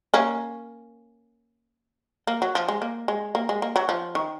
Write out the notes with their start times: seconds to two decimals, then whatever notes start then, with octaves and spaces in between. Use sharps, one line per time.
0.14 A#3 C#4
2.27 A#3
2.42 F#3
2.55 F3
2.68 G#3
2.82 A#3
3.08 G#3
3.35 A#3
3.49 G#3
3.62 A#3
3.76 F#3
3.89 F3
4.15 D#3